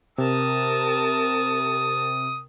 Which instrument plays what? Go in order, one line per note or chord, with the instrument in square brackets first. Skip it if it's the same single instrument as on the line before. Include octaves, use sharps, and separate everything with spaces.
[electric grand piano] C3 [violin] A#4 A5 [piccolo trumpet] D#6